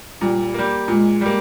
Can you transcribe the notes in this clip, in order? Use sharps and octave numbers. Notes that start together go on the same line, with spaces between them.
A#2 G3
G3 A#3
A#2 G#3
G3 A#3